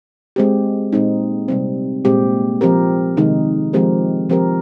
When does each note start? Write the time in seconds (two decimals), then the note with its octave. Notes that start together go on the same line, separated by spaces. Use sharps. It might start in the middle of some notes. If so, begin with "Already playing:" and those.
0.36 G#3 C4 G4
0.93 A#2 G#3 C4 D#4
1.48 C3 G3 C4
2.05 A#2 G#3 C4 G4
2.61 F3 C4 G4 A#4
3.17 C3 D#3 G#3 D#4
3.73 F3 G#3 C4 G4 A#4
4.30 F3 C4 G4 A#4